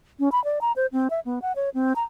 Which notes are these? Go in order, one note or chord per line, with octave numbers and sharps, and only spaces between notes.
C#4
B5
D5
A#5
C5
C4
E5
B3
F#5
C#5
C4
A#5